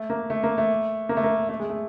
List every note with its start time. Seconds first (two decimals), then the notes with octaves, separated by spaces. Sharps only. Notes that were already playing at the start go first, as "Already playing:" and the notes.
Already playing: A3
0.10 A#3
0.30 A3
0.43 A#3
0.58 A3
1.09 A#3
1.17 A3
1.24 A#3
1.49 A3
1.60 G#3
1.70 A3